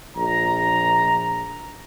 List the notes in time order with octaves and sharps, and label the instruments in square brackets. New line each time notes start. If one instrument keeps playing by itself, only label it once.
[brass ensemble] A#1 A#5